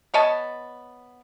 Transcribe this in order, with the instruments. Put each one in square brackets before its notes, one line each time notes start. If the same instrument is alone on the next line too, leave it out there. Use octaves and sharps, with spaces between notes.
[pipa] B3 C#5 D#5 A5